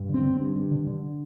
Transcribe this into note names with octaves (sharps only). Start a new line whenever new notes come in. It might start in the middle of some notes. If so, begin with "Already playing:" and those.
Already playing: G2
D3
C4
D3
G2
G2
D3
D3